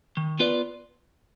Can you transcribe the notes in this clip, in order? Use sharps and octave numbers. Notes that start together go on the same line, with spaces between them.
D#3
B3 F4 B4 D5